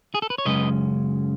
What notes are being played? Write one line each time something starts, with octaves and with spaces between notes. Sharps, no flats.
G#4
A4
B4
C#5
F#2 C#3 G#3 C#4 B4 D#5